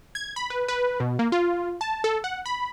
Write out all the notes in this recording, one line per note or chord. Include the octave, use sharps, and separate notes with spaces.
G#6
B5
B4
B4
B2
A#3
F4
A5
A4
F#5
B5